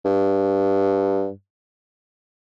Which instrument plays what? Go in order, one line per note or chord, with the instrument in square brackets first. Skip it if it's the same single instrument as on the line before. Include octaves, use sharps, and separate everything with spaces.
[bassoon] G2